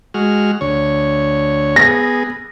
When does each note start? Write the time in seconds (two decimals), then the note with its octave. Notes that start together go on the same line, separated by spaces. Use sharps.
0.14 G#3 F#4 F6
0.61 D2 C#5
1.76 B3 G#4 A#6